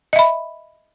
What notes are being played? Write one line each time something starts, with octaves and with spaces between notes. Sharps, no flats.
D#5 E5 B5